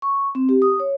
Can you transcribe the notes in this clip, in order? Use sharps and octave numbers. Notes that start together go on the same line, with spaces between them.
C#6
C4
G4
D#6
C#5